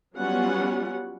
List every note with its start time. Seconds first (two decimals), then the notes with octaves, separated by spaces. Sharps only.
0.16 F#3 G3 B3 C#4 F4 F#5